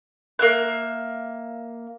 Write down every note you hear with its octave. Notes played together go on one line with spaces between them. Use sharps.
A#3 E5 F#6